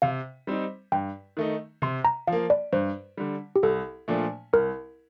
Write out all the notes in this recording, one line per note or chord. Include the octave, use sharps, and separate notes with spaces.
C3 F5
G3 C4 D#4
G2 G5
D#3 A3 D#4
C3 C6
A#5
F3 A#3 F5
D5
G2 C5
D3 G3
G4
C2 A4
A#2 F3 A3 D4
C2 A#4